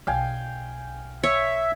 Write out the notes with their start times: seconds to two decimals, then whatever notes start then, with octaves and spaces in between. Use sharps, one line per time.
0.07 B1 F5 G5 G#5
1.23 C#5 E5